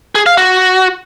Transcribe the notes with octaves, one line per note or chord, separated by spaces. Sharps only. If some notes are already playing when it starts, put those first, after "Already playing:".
G#4
F5
F#4